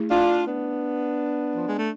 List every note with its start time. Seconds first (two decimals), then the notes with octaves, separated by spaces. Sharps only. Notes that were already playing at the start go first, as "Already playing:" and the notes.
Already playing: A3 E4 G#4
0.11 D4 F4
0.47 B3 D4
1.56 F3
1.67 G#3
1.78 A3